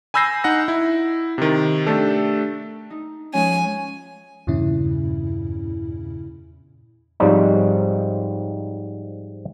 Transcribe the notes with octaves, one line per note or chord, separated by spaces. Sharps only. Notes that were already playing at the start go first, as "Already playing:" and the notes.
G#5 B5 E6 G6 A#6 C7
D#4 F#5 A#6
E4
C3 D#3
A3 D4 G4 A4
D#4
F3 G#3 C#4 G#5
E2 G2 A#2 C#3 C#4 E4
G#2 F3 G3 C4 C#4 D#4